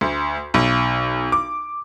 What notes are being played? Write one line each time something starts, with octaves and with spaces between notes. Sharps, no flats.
D2
B1
D6